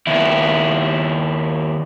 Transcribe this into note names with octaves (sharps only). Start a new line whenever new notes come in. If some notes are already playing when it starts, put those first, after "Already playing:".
D#2 E4